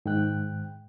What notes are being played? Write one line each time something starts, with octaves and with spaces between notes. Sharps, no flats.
G#2 D#3 G5 F#6